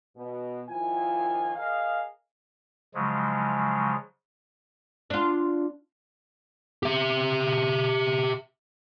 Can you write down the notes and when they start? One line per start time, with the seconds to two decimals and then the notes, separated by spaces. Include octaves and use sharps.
0.16 B2
0.69 D#2 D#3 F3 E4 F4 G#5
1.56 G#4 A#4 D#5 F5
2.94 C#3 F3 F#3 G#3
5.10 D4 F4
6.83 G4 E5